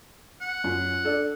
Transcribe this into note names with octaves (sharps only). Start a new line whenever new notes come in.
F#5
F#2 F4
D4 A4 D5